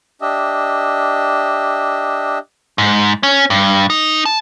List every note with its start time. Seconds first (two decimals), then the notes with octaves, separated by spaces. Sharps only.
0.21 D4 G4 D#5 E5
2.78 G#2
3.23 C#4
3.50 G2
3.90 D#4
4.25 A5